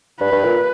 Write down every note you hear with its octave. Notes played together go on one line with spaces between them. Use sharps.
G2 B4
G2
A#2